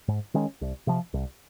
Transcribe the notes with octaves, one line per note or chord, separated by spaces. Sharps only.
G#2
D#3 G#3 C#4
C2
C3 F3
C2